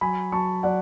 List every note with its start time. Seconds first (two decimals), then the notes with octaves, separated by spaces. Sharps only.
0.01 F#3 G#5 B5
0.32 F#3 A5 C#6
0.63 F#3 D5 F#5